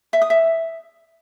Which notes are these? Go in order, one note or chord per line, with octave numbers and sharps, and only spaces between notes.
E5
D#6
E5